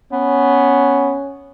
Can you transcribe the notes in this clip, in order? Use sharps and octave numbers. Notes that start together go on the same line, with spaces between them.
B3 C#4